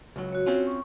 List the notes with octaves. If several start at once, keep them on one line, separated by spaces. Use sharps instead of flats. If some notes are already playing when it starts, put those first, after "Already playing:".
C#2 F#3
F#4 C#5
C4 C#4 F4
C#6